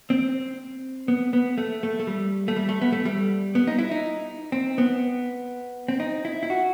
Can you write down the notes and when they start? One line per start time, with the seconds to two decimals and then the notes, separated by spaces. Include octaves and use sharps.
0.10 C4
1.08 B3
1.33 B3
1.58 A3
1.83 A3
1.99 A3
2.07 G3
2.48 A3
2.56 G3
2.69 A3
2.81 B3
2.93 A3
3.05 G3
3.55 B3
3.67 D#4
3.79 E4
3.91 D#4
4.52 C4
4.78 B3
5.88 C4
6.00 D#4
6.25 E4
6.43 E4
6.50 F#4